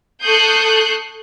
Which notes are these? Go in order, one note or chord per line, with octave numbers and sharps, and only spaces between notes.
A4 C#6 D#6 F#6 G6 C7